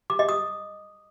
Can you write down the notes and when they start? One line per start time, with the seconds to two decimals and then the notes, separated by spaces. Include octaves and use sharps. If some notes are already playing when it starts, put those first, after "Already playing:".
0.10 D6
0.19 D#5
0.29 D#6